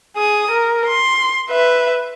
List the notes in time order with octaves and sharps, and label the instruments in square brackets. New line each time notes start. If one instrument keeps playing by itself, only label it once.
[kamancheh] G#4 D#6
A#4
C6
B4 E5